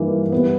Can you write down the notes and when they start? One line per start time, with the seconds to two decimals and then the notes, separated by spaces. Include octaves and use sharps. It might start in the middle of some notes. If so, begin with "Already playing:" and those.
Already playing: G2 E3 A#3 D#4 A#4
0.32 G3 B3